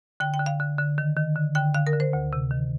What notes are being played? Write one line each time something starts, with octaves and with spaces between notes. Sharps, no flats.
D3 G5
G5
D3
F5
D3
D3
D#3
D#3
D3
D3 G5
D3 F5
A#4
D3
C5
D2
C3
D#3